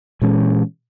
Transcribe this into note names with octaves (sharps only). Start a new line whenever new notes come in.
A#2 E3 G#3 C#4